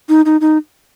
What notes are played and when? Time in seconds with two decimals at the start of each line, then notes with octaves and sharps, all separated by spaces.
0.09 D#4
0.26 D#4
0.41 D#4